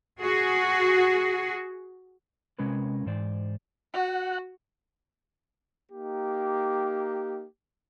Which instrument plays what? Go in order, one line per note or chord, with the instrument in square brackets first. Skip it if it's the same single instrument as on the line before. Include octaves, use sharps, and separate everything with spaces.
[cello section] F#4 G#4
[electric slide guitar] C3 G#3 C#4 A#4 B4
G#2 E3 C5 D5
[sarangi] F#4 [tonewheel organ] F#5
[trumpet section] A#3 D#4 G4